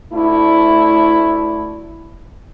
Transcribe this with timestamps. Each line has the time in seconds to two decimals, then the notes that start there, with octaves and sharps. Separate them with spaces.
0.13 D2 A3 E4